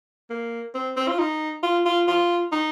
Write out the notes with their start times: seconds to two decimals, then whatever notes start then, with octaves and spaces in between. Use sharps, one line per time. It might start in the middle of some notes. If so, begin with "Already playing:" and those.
0.30 A#3
0.74 C4
0.97 C4
1.08 F4
1.19 D#4
1.63 F4
1.86 F4
2.08 F4
2.52 D#4